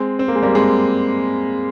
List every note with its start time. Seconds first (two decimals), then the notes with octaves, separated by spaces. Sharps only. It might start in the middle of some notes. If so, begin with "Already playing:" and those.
Already playing: G#3 C4
0.19 C4
0.28 A#3
0.36 G#3
0.43 G3 A#3
0.55 G#3 C4